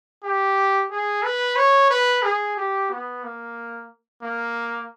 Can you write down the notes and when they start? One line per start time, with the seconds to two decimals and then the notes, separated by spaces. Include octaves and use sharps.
0.23 G4
0.91 G#4
1.23 B4
1.56 C#5
1.90 B4
2.23 G#4
2.57 G4
2.90 B3
3.24 A#3
4.22 A#3